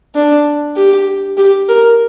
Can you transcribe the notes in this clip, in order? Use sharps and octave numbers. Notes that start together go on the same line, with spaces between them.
D4
G4
G4
A#4